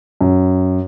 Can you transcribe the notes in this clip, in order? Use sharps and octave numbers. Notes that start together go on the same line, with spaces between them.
F#2